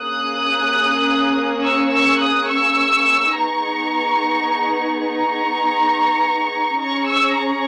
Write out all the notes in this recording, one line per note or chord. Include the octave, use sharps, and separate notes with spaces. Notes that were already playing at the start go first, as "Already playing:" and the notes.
Already playing: A#3 C#4 G#4 D#6 F#6
C#6 E6
C#6 E6
D#6 F#6
C#6 E6
B3 D#4 G#4 A#5 C#6
A#5 C#6
C#4 G#4 A#5 C#6
C#6 E6
A#5 C#6